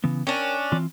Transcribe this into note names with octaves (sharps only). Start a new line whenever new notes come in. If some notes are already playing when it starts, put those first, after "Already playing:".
C#3 E3 B3
C#4 D4 A#4 G5
E3 C4 F4